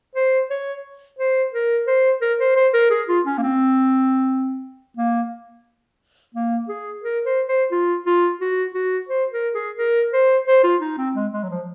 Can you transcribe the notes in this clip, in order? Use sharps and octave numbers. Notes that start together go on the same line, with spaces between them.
C5
C#5
C5
A#4
C5
A#4
C5
C5
A#4
G#4
F4
C#4
A#3
C4
A#3
A#3
G#4
A#4
C5
C5
F4
F4
F#4
F#4
C5
A#4
G#4
A#4
C5
C5
F4
D#4
C4
G#3
G#3
F#3
F3